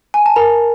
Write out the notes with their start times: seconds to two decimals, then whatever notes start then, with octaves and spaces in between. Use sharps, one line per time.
0.14 G#5
0.26 A5
0.36 A#4 A#5